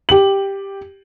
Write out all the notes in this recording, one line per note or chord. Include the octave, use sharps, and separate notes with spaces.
G4 F#7